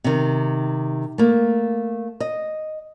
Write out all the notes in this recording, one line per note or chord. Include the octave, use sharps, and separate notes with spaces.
C3 D#3
A3 A#3
D#5